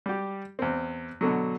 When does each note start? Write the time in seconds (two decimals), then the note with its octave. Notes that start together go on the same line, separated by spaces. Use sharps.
0.06 G3 G4
0.59 E2 C4
1.21 B2 D3 F#3